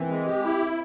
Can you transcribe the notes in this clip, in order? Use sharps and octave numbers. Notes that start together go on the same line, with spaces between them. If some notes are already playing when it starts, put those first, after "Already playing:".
Already playing: E3 A#3 C4
G#3
G4
E4